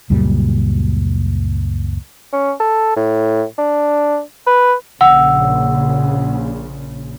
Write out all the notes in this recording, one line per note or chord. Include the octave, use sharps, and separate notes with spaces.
C#2 F#2 A#2 G3
C#4
A4
A2
D4
B4
A#1 C#3 F#5 E6